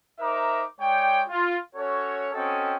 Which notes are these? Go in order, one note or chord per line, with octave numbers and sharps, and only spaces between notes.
D#4 A#4 C5 E5 A#5 D6
G#3 C#5 D5 G5
F4
C#4 F#4 A4 C#5
C4 C#4 F#4 A4 D#5 G5